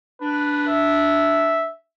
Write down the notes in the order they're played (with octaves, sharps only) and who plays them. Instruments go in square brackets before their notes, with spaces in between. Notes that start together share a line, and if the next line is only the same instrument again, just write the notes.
[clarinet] D4 [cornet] B4
[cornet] E5